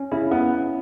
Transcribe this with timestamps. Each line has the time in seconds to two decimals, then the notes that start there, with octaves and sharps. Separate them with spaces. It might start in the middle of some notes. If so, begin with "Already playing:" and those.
Already playing: C#4
0.12 C#3 E4
0.31 B3